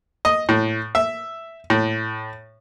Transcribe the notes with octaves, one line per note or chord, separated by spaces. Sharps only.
D#5
A2
E5
A2